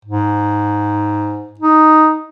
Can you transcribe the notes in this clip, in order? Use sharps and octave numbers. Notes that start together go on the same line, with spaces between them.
G#2
D#4